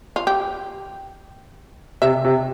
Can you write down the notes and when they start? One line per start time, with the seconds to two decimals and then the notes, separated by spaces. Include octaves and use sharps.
0.16 F4
0.27 G4
2.02 C3 E5
2.25 C3